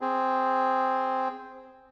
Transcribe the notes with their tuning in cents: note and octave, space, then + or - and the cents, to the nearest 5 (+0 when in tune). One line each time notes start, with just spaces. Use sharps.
C4 +0 G#4 -5